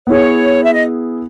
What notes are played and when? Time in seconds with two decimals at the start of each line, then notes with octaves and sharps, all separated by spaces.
0.07 B3 E4 G#4 C#5
0.64 E5
0.73 D#5